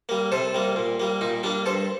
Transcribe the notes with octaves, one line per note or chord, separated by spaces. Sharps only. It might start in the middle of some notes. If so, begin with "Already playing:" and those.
G3 A#3
C3 A4 C5
G3 A#3
A#2
G3 A#3
A#2 D#4
G3 A#3 D4
G2 A4 C5